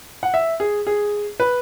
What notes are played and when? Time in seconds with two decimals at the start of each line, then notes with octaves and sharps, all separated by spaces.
0.23 F#5
0.34 E5
0.60 G#4
0.87 G#4
1.40 B4